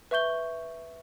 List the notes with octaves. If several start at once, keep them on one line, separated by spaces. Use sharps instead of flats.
B4 E5 C#6 G6 G7